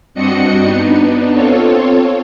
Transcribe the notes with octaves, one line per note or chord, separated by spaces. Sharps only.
G2 C4 D4 F#4 D#5 C#7
B3 D4 D#4
C4 F4 A4 C#5